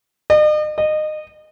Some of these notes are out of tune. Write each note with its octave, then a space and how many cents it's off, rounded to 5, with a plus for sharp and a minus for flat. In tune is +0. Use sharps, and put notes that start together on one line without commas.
D#5 -45
D#5 -25